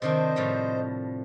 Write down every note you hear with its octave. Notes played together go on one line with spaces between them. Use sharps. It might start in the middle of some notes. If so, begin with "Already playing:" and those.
C3 D#3 D4 C5 D#5
A2 F3 G3